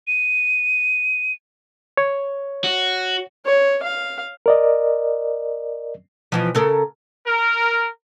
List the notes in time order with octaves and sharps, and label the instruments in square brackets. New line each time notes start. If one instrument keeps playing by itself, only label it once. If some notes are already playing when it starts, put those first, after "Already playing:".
[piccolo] D#7
[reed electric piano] C#5
[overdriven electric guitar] F#4
[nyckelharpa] C#5
F5
[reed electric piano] A#4 D5 D#5
[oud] B2 E3 F3
C#3 A4 A#4
[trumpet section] A#4